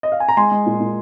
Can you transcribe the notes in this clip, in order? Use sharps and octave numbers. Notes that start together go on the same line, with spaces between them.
D#5
F5
G#5
A#5
G#3 G#5 C6
G#3
A#2
A#2